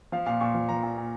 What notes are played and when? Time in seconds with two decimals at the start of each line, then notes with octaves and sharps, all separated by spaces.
0.12 F3 F5
0.26 A#2 F5
0.41 A#2 C#6
0.54 F3
0.69 F3 A#5
0.83 A#2
0.98 A#2